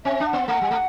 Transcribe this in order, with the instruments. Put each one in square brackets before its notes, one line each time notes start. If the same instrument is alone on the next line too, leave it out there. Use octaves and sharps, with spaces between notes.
[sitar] C4 [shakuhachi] E5
[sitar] D4
[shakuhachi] F#5
[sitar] B3
[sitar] A3 [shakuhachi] F#5
[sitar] G3
A3